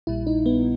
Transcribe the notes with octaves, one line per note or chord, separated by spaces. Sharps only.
A#1 A#2 G3 E4
D#4
B3